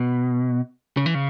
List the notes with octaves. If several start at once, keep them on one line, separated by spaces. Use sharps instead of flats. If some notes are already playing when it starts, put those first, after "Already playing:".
Already playing: B2
C#3
E3
C#3